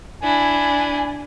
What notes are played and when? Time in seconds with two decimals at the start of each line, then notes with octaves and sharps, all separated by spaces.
0.23 D4 E4 G#5